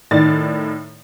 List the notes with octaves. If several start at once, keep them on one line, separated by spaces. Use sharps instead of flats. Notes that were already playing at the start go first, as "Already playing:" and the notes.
A2 D#3 D5 A6